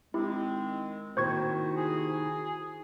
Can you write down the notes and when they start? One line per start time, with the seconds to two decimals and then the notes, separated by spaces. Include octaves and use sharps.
0.14 D#3 G#3 C4 E4 G4
1.17 C3 D#3 A#3 E4 F#4 C5 C#6 G#6
1.77 G#4